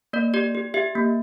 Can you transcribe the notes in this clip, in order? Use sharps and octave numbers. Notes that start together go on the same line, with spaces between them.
A#3 D5
G4 D5
G4
G4 E5
A#3